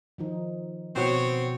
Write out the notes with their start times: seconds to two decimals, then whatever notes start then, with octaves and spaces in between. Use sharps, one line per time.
0.18 D#3 F3 D#4
0.96 B2 C4 F#4 C#5 C#7